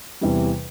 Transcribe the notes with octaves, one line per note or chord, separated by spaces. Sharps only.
E2 C3 E3 G3